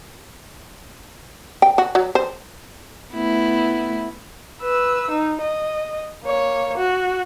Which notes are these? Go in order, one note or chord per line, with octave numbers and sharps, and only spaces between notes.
G5
F#4
F#3
C5
A3 B3 E4
B4 E6
D#4
D#5
A#3 C#5
F#4